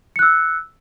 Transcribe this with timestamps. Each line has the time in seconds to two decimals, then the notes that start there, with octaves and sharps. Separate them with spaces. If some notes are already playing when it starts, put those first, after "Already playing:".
0.16 C#7
0.19 F#6
0.22 E6